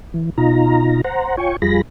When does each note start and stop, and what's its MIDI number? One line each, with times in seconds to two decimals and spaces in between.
0.14 0.30 52
0.38 1.01 47
0.38 1.01 63
0.38 1.01 65
0.38 1.01 82
1.04 1.36 72
1.04 1.36 78
1.04 1.36 82
1.37 1.56 65
1.37 1.56 73
1.37 1.56 79
1.37 1.56 80
1.37 1.56 85
1.62 1.81 41
1.62 1.81 55
1.62 1.81 65
1.62 1.81 68
1.62 1.81 83
1.62 1.81 94